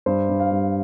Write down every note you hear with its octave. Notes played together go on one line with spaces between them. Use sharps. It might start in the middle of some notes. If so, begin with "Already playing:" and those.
G2 C5
G2
F5
G2